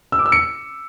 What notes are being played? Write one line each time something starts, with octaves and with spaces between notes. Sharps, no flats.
E6
D6
E6
C#7